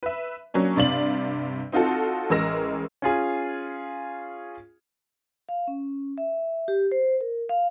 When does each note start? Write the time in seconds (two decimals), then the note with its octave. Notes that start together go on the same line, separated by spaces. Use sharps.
0.03 B4 E5
0.54 F#3 A#3 C#4 D4
0.76 G2 C3 D5 F5 F#7
1.72 C4 D#4 F4 F#4 A4
2.30 A1 G#3 A#4 E6 A#6
3.02 C#4 F4 G#4
5.49 F5
5.68 C#4
6.18 E5
6.68 G4
6.92 C5
7.21 A#4
7.49 F5